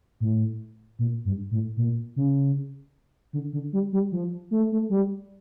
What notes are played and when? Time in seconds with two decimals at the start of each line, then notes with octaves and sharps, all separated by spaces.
0.20 A2
0.99 A#2
1.25 G2
1.51 A2
1.77 A#2
2.16 C#3
3.33 D3
3.53 D3
3.73 G3
3.93 G3
4.12 F3
4.51 A3
4.72 A3
4.90 G3